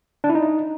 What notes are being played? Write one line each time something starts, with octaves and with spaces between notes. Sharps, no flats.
D4
E4
D#4